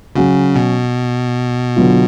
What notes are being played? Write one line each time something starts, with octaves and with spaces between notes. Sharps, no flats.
C#3 F#3 C#4 F#4
B2
D3 F#3 B3 F4